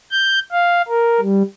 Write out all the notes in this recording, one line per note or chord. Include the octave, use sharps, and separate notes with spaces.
G6
F5
A#4
G3